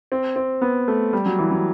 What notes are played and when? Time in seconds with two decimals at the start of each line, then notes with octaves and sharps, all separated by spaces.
0.12 C4
0.36 C4
0.61 B3
0.88 A3
1.13 G3
1.26 F#3
1.39 E3
1.51 F#3